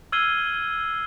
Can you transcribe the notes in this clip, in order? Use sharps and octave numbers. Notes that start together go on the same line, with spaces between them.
E6 F6 G#6 C7 D#7 G7